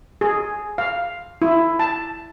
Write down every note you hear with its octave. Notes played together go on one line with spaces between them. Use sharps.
G#4
F5
E4
A5